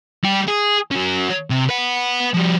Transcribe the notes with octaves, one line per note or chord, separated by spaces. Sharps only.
G3 G4
G#4
F#3 C#4
C3
B4 F#5
F3 G3